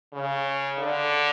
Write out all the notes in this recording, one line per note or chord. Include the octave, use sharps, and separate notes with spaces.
C#3
D3